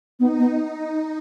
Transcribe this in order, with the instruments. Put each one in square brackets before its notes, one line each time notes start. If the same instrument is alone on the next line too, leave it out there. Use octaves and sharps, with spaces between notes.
[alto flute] B3 [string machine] D#4
[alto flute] B3